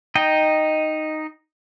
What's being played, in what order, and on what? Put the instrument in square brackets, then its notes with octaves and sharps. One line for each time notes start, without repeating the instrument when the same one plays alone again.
[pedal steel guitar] D#4 D#5 G5